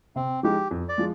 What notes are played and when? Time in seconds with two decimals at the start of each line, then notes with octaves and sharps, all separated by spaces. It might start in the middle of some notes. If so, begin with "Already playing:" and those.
0.16 C3 C4
0.43 F3 G#3 D#4 G4
0.71 F2
0.89 D5
0.98 F3 G#3